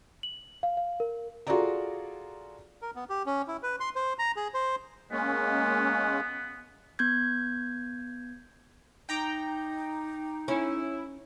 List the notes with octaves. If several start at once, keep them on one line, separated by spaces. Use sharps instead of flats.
F#7
F5
F5
A#4
F4 F#4 G#4 A4 D5 A#5
A#4
B3
G4
C#4
E4
B4
C6
C5
A#5
G#4
C5
G#3 A#3 B3 C#4
B3 G6 G#6
D#4 G5 A#5 D6
C#4 E4